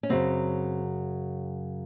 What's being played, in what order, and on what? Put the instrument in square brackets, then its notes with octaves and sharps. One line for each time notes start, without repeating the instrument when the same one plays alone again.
[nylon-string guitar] C#4
F#2 C#3 F#3 C4